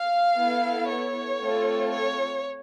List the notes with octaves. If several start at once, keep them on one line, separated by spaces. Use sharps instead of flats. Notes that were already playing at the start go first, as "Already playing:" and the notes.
Already playing: F5
B3 E4 A4
C#5
A3 C4 F4 A4
C#5